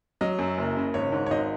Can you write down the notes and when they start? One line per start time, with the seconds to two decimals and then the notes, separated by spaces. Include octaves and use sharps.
0.21 F#3 D#5
0.39 F#2
0.58 F#1
0.76 C#3
0.94 G#1 C#5
1.12 G#2
1.26 C#5
1.31 G#1 D#5